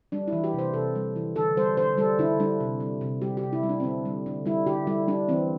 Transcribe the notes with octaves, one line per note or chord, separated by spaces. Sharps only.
G3 D4
E3 E4
G4
C3 C5
C3 A4
G3
E3
D3 A4
G3 C5
D3 C5
G3 A4
D3 E4
G3 D4
C3
G3
C3
G3 G4
G4
C3
E4
G3
D4
C4
D3 D4
G3
D3
G3 E4
D3 G4
G3 E4
G3 D4
E3 C4